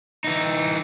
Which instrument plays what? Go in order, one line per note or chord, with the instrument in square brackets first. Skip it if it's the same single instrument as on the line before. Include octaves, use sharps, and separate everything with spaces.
[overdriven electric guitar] E3 D#4